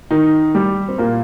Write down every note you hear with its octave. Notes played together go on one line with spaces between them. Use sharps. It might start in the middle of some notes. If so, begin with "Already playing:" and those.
D#3 D#4
G3 G4
C4
A#2 A#3